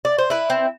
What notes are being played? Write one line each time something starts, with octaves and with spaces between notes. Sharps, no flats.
D5
C5
E4 B4
C4